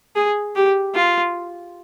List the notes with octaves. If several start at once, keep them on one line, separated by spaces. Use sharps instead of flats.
G#4
G4
F4